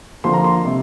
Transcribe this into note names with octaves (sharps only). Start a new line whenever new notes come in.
D3 F3 A#3 C6
A#5
C6
C3 G3